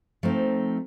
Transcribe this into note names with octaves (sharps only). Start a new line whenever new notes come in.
F3 A3 C4 D#4